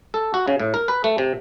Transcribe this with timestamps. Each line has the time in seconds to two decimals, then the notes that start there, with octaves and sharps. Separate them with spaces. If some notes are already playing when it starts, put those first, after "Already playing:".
0.14 A4
0.34 F#4
0.48 C#3
0.60 A2
0.74 A#4
0.88 B4
1.04 A3
1.18 C3